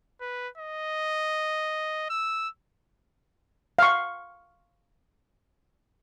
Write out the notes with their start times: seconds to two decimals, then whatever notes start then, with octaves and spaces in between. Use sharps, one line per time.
0.21 B4
0.58 D#5
2.10 E6
3.79 F5 C#6